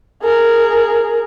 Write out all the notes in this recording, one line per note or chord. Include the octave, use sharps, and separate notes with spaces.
G#4 A#4